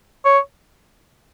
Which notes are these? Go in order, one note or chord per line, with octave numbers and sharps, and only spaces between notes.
C#5